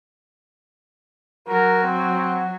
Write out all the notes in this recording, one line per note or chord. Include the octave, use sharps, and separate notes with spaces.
F#3 F#4 A#4
C4